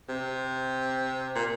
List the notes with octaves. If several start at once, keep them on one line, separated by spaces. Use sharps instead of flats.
C3
A#2